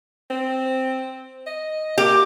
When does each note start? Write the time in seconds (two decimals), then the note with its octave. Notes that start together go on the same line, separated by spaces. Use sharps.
0.30 C4
1.46 D#5
1.98 A#3 G4